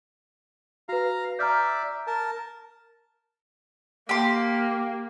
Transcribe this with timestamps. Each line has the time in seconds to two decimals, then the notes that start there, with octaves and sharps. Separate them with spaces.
0.89 F#4 B4 F5 A#5
1.39 D5 E5 A#5 F6 G6
2.07 A#4 A5
4.09 A#3 G4 C6